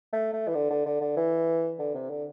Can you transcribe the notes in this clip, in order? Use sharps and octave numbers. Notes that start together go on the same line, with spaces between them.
A3
A3
E3
D3
D3
D3
D3
E3
D3
C3
D3